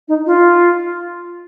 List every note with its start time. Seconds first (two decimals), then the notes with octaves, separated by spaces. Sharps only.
0.08 D#4
0.26 F4